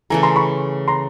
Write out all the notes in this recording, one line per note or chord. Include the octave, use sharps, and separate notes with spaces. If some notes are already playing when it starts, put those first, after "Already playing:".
C#3 E3 A3 G#5 A#5
A#5 C6
B5 C#6
A#5 C6